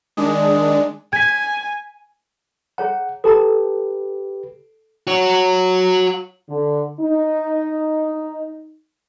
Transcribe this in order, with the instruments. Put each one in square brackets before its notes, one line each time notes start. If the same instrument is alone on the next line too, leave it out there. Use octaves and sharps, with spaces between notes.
[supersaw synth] D#3 G#3 D4 [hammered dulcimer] G#4 D5
[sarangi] G#5 [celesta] G#6 B6
[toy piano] G#4 C#5 A#5 [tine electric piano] F#5
[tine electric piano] G4 B4 [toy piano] A4 A5 A#5
[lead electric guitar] F#4 C#5
[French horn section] D3
D#4